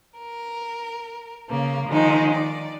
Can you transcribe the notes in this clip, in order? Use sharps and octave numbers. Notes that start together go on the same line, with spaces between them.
A#4
C#3 A#3
D#3 F3 G#3 D#4
D5